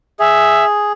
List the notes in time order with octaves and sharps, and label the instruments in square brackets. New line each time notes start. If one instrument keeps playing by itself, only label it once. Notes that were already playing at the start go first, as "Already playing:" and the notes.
[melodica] G#4 [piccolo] E5